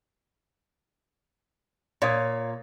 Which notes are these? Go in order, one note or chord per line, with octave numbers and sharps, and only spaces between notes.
A#2 C#5 F5 D#6